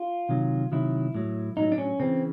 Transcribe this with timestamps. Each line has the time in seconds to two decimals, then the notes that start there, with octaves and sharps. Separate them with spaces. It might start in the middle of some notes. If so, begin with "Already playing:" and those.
Already playing: F4
0.29 C3 D#3 F#3
0.72 C3 D#3 F#3 E4
1.15 A2 F#3
1.57 A2 F#3 D#4
1.72 D4
1.78 C#4
2.00 C#3 E3 C4